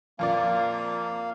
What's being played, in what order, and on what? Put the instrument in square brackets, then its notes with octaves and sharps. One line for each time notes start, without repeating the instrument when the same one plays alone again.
[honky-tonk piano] F2 A#2 D5 [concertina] A#3 F5